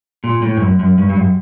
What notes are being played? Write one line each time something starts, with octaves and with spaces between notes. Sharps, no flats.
A#2
A2
G2
F#2
F#2
G2
G2
F#2